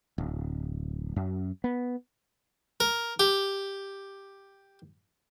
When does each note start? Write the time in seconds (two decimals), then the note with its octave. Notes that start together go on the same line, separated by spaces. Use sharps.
0.18 D1
1.16 F#2
1.64 B3
2.80 A#4
3.20 G4